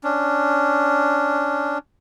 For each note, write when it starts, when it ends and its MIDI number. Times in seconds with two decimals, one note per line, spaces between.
0.04 1.78 61
0.04 1.78 62